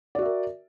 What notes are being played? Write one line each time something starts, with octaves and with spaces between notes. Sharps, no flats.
F#4 A#4 D5 E5